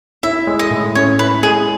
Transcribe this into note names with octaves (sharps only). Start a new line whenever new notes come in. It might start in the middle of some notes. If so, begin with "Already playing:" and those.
E4 E5
G#3
D#5
A2
C#4 C#5
E4 B4
G#3 G#4